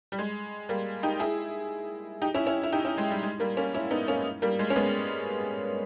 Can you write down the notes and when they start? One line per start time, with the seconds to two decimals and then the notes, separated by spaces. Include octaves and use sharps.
0.12 G3
0.19 G#3
0.69 G3 A#3
1.03 D#4 G4
1.20 E4 G#4
2.22 D#4 G4
2.34 C#4 E4
2.47 C#4 E4
2.63 E4
2.72 D#4 G4
2.85 C#4 E4
2.98 G#3
3.10 G3
3.23 G#3
3.40 G3 A#3
3.57 A#3 C#4
3.74 C#4 E4
3.91 B3 D#4
4.08 A#3 C#4
4.42 G3 A#3
4.59 G#3
4.70 C#4
4.76 G#3 B3